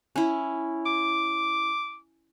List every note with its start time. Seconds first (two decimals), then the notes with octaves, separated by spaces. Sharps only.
0.16 C#4 E4
0.86 D6